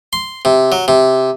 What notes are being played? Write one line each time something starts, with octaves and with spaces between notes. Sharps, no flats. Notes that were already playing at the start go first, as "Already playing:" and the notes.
C6
C3
F#3
C3